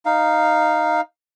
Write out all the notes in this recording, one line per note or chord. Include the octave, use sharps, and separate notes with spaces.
D#4 F5